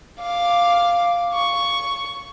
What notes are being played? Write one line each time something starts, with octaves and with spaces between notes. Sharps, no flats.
F5 D6
C#6